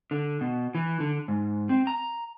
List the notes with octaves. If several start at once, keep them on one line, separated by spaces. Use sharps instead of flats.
D3
B2
E3
D3
G#2
C4
A#5